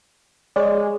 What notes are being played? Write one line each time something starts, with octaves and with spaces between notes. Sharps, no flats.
G#3 C#5 D5